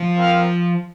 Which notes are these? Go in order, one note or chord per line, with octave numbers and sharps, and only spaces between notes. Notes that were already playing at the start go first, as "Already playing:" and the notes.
Already playing: F3
C4 F4 A#4 F5